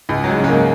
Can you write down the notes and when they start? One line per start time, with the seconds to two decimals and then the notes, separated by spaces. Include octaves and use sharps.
0.09 C#2
0.24 F#3 G#3
0.39 C#3 G#3
0.49 A#3